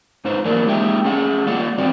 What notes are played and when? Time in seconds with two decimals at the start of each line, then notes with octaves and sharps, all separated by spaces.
0.25 G#2 D#4 B4 C5
0.45 E3 F#3 A#3 A#4 D5
0.65 G#3 A#3 D#4 G4 E5 G5
1.04 A3 C#4 G#4 F#5
1.46 G3 A#3 D5 F5 F#5
1.77 G#2 E3 C4 F#4 D5